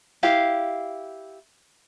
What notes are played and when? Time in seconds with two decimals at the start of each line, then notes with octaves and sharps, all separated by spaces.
0.23 E4 G4 F5